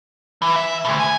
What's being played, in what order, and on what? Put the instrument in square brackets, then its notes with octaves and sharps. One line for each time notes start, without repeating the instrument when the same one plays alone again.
[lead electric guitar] E3
E5
D2 B2
G#5